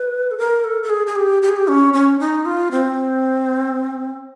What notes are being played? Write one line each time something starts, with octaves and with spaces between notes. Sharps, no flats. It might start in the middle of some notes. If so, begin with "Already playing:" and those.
Already playing: B4
A4
A#4
A4
A4
G#4
G#4
G4
G4
G#4
G4
C#4
C#4
D#4
F4
C4